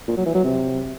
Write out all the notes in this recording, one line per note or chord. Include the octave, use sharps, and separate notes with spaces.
A#2
F#3
E3
F#3
C3